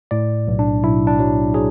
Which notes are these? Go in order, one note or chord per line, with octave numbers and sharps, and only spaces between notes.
A2 D5
B1
D4
B1 E4
D4
F#3
F#3 G#4